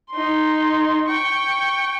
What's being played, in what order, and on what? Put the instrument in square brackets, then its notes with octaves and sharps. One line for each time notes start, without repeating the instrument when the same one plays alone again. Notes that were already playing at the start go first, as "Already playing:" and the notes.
[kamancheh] D#4 C6
G5 C#6